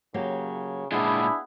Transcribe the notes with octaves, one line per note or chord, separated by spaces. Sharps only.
C#3 F#3 A#3 G4
A#2 G#3 B3 D4 E4 F4 G#4 F#5